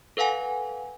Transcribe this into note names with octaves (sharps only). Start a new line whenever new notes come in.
A4 B4 F5 F#5 G#5